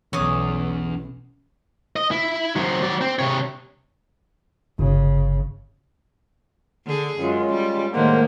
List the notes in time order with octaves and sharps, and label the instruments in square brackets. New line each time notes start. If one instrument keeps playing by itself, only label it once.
[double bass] B1 [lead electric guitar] E2 [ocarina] C#4 [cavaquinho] C#5 D6 D#6
[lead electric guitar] D#5
E4
F#3 C4
F#3 D5
C4
C3 C#5
[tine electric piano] G1 [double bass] C#3
[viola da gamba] D3 G#4
[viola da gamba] F#2 [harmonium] G#3 C#4 F4
[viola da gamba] G3
[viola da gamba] A2 D#3 [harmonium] G#3 C5 F#5 [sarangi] A#3